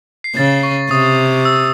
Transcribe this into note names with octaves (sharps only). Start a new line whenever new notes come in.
C7
C#3 A6
C#6
C3 D#6
E6